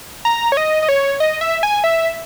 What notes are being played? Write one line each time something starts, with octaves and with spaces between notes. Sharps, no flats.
A#5
C#5
D#5
D#5
C#5
D#5
E5
G#5
E5